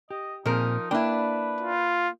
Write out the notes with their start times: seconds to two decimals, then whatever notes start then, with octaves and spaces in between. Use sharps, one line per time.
0.11 G4 D#5
0.46 A#2 F3 C4 D#4 G#4 A#4
0.91 A#3 D4 E4 A#4 B4 G5
1.61 F4